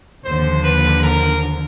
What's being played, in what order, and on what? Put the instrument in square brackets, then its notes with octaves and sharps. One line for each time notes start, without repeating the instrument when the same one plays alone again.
[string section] D#2 D3 F3 [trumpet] C5
[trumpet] B4
A#4